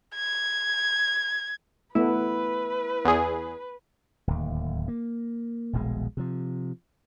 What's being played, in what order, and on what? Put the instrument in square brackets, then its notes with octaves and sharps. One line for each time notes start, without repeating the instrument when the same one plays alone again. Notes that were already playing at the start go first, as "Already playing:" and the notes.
[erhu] G#6
[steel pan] A3 B3 [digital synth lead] E4 [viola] B4
[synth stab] E2 G#4
[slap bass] D1 D#2
A#3
D#1 A#1 B2 G#3
C3 F3